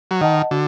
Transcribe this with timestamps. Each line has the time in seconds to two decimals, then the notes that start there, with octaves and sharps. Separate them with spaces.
0.11 F#3
0.21 D#3 D#5 F#5 A5
0.51 D3 F#4